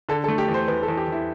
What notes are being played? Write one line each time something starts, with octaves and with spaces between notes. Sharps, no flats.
D3 A4
A4
A3
G4
E2
C5
E2 B4
A4
E2
G4
E2 E4